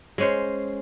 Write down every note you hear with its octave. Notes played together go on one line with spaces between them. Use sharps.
G#3 C#4 C5